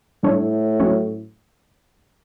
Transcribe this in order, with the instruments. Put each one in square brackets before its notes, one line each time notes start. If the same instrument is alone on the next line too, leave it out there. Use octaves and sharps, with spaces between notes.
[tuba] A2 [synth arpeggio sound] G3 D4 A4 C#5
[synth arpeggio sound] F#3 A3 C#4 F#4 C#5